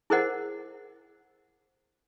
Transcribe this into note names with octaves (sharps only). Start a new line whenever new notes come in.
E4 G#4 A#4 C5 D#5 F#5